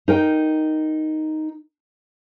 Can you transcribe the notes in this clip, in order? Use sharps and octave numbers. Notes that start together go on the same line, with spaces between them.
D#4 A#4 G5